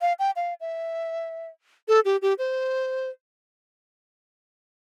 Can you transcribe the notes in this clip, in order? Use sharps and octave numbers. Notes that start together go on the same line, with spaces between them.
F5
G5
F5
E5
A4
G4
G4
C5